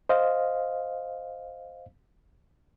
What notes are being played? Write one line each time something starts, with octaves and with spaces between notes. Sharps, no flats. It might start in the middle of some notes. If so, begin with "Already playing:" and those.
C5 D#5 F5